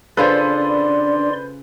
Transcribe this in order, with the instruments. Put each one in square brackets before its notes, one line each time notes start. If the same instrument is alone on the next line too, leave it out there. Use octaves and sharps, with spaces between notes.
[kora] C#3 F4 A4 [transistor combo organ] D4 [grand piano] B4 C5 [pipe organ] D5 C6